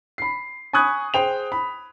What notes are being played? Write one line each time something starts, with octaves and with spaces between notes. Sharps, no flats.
B5 C7
G#5 B5 C#6 D#6 F#6 G#6
G#4 C5 G5 F7
B5